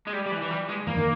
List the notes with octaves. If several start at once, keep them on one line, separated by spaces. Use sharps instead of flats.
G#3
G3
G3
E3
E3
G3
G#3
E3 A#3
D#3